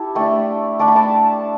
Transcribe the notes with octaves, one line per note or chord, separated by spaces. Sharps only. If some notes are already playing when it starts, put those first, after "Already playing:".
Already playing: E4 G4 A4 A5
A3 D4 G5 B5
A3 D4 A5 D6
G5 B5
A5 D6